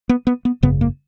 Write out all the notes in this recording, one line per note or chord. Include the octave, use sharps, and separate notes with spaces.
B3
B3
B3
G#1 F#2 C#3 B3
A#3